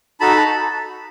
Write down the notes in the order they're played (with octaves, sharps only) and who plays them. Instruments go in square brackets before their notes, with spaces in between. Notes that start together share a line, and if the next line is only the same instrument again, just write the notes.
[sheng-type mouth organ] D#4 F#4 A4 A5 B5